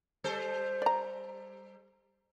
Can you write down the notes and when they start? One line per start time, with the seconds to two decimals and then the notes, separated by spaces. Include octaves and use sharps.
0.24 G3 A4 C5
0.82 D5 A#5